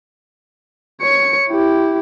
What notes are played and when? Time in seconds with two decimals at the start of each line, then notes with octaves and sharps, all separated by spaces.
1.01 C#5 C#7
1.50 E4 G4